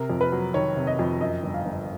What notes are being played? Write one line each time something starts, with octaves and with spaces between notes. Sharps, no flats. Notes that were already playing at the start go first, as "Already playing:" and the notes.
Already playing: C3 A#4
F2
B4
F#3
D#3 C#5
C3
D#5
F2
F#2 D#5
G1
F5
G1